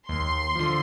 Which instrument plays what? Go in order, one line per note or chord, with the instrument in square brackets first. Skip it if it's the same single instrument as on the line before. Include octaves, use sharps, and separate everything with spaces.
[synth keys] D#2 [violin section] C6
[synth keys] D3 F3